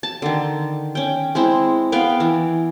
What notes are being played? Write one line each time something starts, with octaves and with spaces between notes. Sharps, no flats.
A5
D3 D#3
C#4 G5
G#3 C4 E4
B3 B4 F5 G5
E3